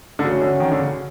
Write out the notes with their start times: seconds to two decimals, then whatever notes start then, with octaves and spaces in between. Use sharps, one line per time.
0.19 D3
0.24 C#3 A3 C#4 F#4
0.41 D3
0.60 D#3
0.72 D3
0.79 C#3